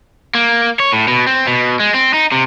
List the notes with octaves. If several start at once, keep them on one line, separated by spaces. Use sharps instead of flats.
A#3
C#5
A2
B2
C4
B2
G#3
C4
D#4
C3